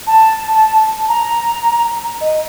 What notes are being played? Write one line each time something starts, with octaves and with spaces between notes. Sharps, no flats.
A5
A#5
D#5